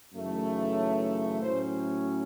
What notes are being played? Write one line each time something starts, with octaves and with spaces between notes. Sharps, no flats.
F#2 C#3 E3 A3 D#4
C#5
A2 F#3 C#4 C5